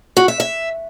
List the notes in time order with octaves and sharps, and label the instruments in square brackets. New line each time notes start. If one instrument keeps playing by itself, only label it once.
[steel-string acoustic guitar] F#4
E5
E5